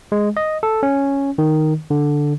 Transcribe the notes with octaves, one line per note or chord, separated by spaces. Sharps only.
G#3
D#5
A4
C#4
D#3
D3